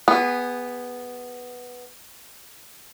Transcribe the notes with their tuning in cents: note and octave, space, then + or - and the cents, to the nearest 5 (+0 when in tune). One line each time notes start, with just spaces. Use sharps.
B3 +0 G#4 -30